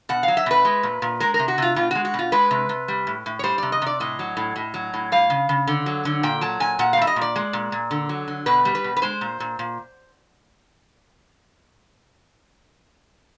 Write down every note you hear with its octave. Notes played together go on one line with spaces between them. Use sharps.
B2 F#5
F#3 F5
E5
B2 B4
G#3
A#2
A#2
G#3 A#4
A#4
C3
F#4
C3 F4
B2 F4
G#3 F#4
F#4
B2
F4
G#3 B4
C3
C3
G3
A2
A2
C#5
G3 C5
C3 D5
D#5
C3 D5
A2 D#5
F#3
A2
A2
F#3
A2
G3 F5
C#3
C#3
D3
F#3
D3
A#2 G5
F#3 A5
A#2 G#5
A#2 F#5
F5
G3 E5
D#5
A#2
D5
G#3
A#2
A#2
D3
F#3
D3
B2 B4
G3
B4
B2
B4
G#3 C5
A#2
A#2
A#2